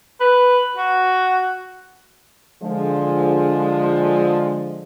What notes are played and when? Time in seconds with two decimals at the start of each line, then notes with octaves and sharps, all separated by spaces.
0.20 B4
0.77 F#4
2.63 D3 F3 G#3